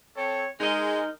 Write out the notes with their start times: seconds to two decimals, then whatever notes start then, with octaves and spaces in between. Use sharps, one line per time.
0.16 C4 A4 C#5
0.60 G#3 D#4 A#4 D#5